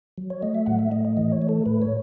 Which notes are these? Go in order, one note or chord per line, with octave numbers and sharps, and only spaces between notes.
F#3
C#5
A3 D#5
E5
A2 F#5
E5
A3 D#5
D#5
E3 D#5
C#5
A3
A4
A2 B4
C#5